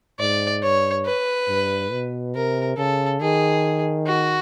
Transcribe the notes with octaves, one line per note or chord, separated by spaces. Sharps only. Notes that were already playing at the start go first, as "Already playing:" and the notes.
G#2 D5
G2 C#5
B4
G2
B2
C3 A#4
C#3 A4
D#3 G#4
F#4